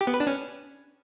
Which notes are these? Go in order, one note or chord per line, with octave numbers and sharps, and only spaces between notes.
G4
B3
B4
D4
C#4